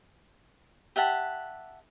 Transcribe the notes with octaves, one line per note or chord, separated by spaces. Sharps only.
G4 E5 F#5 A5